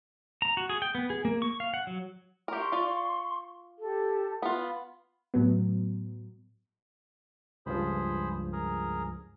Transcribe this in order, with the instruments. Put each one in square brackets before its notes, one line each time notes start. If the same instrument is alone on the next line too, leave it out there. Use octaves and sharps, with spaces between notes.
[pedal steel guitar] A#5
F#4
G#4
G5
B3
G#4
A#3
C#6
F5
F#5
F#3
[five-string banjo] G4 A#4 [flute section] C6 C#6
[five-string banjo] F4 D5
[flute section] G4 A4
[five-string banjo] B3 F4 [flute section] B5
[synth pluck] A2 F#3 B3
[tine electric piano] C#2 G2 F3 [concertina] G#4 C5 B5
[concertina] G#4 A#4